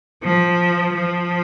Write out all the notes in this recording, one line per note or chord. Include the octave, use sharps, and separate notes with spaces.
F3
F3